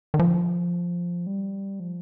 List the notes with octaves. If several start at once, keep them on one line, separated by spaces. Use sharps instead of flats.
D#3
F3
G3
F3